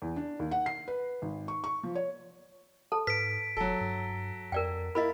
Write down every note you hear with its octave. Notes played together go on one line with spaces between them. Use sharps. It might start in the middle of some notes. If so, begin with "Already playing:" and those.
E2
D4
D#2
F#5
C7
B4
G#1
C#6
C#6
F3
C#5
A4 A5
G#2 B4 B6 D7
F1 F#3 A4
G2
F2 A#4 D5 G5
A#3 E4 D#5 B5